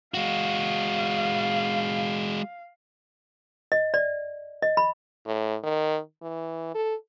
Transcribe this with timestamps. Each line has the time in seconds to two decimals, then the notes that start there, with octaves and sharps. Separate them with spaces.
0.14 G#3 F#4 F5
3.72 D#5
3.94 D5
4.62 D#5
4.77 B5
5.26 A2
5.63 D#3
6.22 E3
6.75 A4